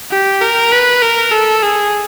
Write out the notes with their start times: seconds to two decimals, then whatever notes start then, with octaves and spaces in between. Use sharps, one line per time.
0.11 G4
0.41 A#4
0.72 B4
1.02 A#4
1.32 A4
1.62 G#4